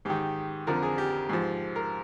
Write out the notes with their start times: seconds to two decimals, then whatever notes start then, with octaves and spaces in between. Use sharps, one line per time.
0.05 G#2 D#3 G4
0.67 F2 D3 F3 A#4
0.83 G#4
0.98 G4
1.29 G#2 F3
1.76 A#4